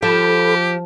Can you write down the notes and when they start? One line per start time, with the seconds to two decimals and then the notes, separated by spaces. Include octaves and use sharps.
0.03 F3 G4 A4 B5